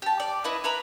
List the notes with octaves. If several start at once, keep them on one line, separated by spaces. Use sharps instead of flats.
G4 A5
D5
E4 B4 D#5
E4 B4 A#5 B5